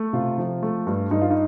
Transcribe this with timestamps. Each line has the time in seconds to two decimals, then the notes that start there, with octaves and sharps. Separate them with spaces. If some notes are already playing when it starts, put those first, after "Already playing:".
Already playing: A3
0.13 C3 F4
0.38 F3
0.63 A3
0.87 G2
1.11 G2 D#4
1.21 F4
1.31 D#4